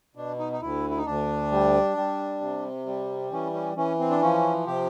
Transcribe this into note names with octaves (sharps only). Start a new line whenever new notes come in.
B2 D4
D#4
D#4
D2 E4
E4
D#4
D2 D4
G3
G3
C3
G3
E3 C#4
C#4
E3 C#4
C4
D4
F3 C#4
C3 G4